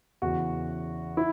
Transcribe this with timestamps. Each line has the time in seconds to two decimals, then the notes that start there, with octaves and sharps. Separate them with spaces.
0.22 E2 C#3 E3 F#4
1.17 E4